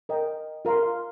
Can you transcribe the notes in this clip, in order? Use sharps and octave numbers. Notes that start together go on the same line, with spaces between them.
A#4 D#5 G5
F4 A#4 F5 C6